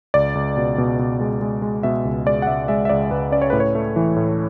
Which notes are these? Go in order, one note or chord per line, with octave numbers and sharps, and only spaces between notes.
C#2 D5
C#2
B2
B2
B2
G#3
G#3
G#3
B2 E5
C#2
G#3 D5
F#5
C#2 E5
G#3 E5
E5
C#2 D5
C#2 B4
C#4 D5
C#5
A2 B4
C#5
A3
E3
A2